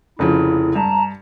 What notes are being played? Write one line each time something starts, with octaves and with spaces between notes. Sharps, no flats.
F1 C#3 F3 E4
G2 A5 A#5